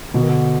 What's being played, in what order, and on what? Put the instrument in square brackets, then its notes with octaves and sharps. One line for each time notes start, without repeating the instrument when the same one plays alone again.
[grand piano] B2 [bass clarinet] D3
[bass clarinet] D#3
D3